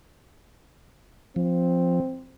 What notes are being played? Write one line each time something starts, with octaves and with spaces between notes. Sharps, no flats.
F3 C4